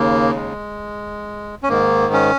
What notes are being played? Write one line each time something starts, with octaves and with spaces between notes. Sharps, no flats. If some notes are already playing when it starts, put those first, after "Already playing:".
Already playing: D#2 C#3 A#3
G#3
C#4
G#2 D#3 A#3
C#4